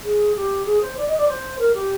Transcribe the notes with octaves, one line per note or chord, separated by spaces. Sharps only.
G#4
G4
G#4
C5
D5
D#5
D5
C5
A#4
G4